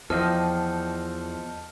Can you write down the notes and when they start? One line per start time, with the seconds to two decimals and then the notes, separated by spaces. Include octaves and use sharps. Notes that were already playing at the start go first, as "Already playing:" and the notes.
0.10 E2 F3 F4 A4 D#5 G5 F6